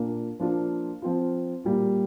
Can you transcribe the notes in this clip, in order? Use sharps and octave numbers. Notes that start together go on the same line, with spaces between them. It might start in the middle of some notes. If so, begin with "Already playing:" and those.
Already playing: A#2 A#3 D4
F3 A#3 D4 F4
F3 C4 F4
A#2 G3 A#3